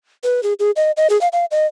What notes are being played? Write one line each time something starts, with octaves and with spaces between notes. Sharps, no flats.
B4
G#4
G#4
D#5
D#5
G#4
F5
F5
D#5